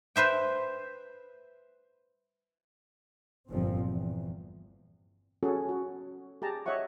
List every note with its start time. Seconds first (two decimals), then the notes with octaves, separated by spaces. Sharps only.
0.16 B4 C5 E5 G5
3.50 G1 F2 A#2 F3 C4
3.86 E2
5.43 C#4 F#4 G#4 A4
5.69 F#4
6.42 G4 G#4 A5 A#5
6.66 C#5 D#5 E5 F#5 C#6